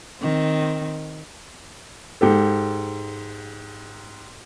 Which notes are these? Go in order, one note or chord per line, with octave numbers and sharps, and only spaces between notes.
D#3 C4
G#2 G4 A4